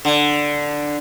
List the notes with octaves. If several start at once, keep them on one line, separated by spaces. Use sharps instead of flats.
D3